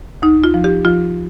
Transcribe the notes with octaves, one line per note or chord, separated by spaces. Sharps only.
D2 D#4
F4
F3
G4
F3 F4